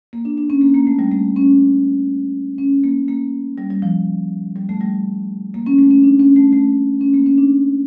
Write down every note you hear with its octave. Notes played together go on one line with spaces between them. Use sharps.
A#3
D4
D4
C#4
A#3
A#3
A3
G3
A3
C#4
C#4
A#3
A#3
G3
G3
F3
G3
A3
G3
A#3
C#4
A3
C#4
D4
C#4
A3
A3
C#4
A#3
C#4
D4